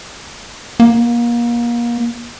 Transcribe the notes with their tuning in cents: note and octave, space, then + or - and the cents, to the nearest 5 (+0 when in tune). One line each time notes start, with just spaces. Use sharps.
A#3 +30